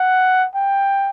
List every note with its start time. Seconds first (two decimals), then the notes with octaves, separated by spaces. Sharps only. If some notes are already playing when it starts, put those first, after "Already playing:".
Already playing: F#5
0.55 G5